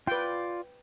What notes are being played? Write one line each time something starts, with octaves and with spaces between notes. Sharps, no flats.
F4 B4 D5 G5